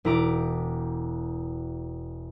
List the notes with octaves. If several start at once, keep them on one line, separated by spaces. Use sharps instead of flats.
E1 E4 A#5 D6